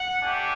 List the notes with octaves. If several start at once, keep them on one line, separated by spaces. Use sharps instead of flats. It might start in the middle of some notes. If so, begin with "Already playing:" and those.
Already playing: F#5
A3 D4 G4 G#5